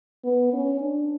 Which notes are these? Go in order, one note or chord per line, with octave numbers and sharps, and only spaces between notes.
B3
C#4
D4